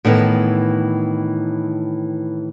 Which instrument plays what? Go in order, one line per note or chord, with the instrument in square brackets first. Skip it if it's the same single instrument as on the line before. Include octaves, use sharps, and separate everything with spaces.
[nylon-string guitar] A2 D#3 E3 B3